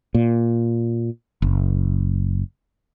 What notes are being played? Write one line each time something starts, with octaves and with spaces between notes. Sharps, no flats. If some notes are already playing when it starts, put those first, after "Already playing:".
A#2
F#1